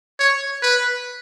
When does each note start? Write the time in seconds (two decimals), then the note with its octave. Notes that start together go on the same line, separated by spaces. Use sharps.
0.19 C#5
0.62 B4